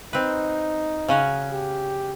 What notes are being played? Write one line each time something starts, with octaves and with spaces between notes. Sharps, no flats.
C4 D#4 B4
C#3 C#4 F#4
G4